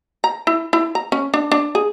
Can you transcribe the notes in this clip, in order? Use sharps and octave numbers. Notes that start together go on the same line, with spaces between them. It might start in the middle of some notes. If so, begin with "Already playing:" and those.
A#5
E4
E4
A#5
C#4
D4
D4
G#4